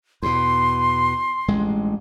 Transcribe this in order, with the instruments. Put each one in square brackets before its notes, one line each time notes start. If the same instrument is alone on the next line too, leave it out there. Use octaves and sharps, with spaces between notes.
[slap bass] E2 B2 [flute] C6
[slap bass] A1 G2 G#3